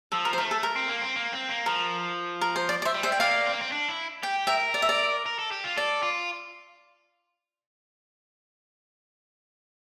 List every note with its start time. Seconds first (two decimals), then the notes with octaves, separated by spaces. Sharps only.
0.12 F3 A4
0.25 A#4
0.33 C5
0.38 A3 A#4
0.51 A4
0.63 A#4
0.76 C4
0.89 A#3
1.01 C4
1.15 A#3
1.33 C4
1.49 A#3
1.66 F3 A#4
2.41 A#4
2.56 C5
2.69 D5
2.82 D5
2.85 C5 E5
2.94 G3
3.03 C5 E5
3.12 G5
3.20 A#3 D5 F5
3.46 C4
3.53 A#3
3.60 C4
3.72 D4
3.89 E4
4.23 G4 G5
4.47 A#4 E5 G5
4.74 D5
4.82 E5
4.89 D5
5.26 A#4
5.39 A4
5.51 G4
5.64 F4
5.76 A4 D5
6.03 F4